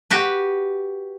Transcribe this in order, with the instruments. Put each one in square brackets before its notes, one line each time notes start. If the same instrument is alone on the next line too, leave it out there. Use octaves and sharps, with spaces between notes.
[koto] F#4 G4 B4